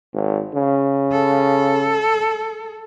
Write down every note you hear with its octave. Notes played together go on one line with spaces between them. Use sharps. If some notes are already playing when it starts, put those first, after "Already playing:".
G#1
C#3
A4